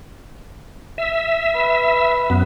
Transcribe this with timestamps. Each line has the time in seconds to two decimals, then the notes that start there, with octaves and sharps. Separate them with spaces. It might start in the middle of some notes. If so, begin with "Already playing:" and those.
0.98 E5
1.55 B4
2.30 F#2 B3